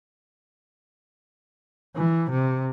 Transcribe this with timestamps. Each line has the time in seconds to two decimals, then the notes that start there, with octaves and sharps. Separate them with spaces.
1.95 E3
2.30 C3